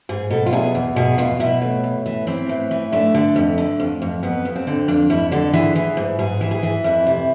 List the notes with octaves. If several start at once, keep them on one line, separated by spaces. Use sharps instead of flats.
G#2 G#4
B2 A4
F4
E2 G#4
E2
B2 G#4
B2 F4
B2 E4
A2
A2
E3
E3 C4
A2
E3
D3 A3
D3
F2
D3
F2
F2
F2 B3
F2
C4
D3
F2 D4
F2 E4
D3 A4
E3 G#4
E3
G#2
G#2 G#4
E3
G#4
E3
F2 E4
C3